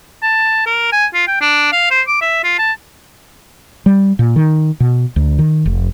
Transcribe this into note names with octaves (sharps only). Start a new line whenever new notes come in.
A5
A#4
G#5
F4
G5
D4
F5
C5
D6
E5
F4
A5
G3
A#2
D#3
B2
D2
D#3
F1